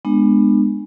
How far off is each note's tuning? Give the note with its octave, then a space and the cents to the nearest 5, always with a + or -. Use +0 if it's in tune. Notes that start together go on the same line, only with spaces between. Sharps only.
G#3 +0 B3 +0 D4 +35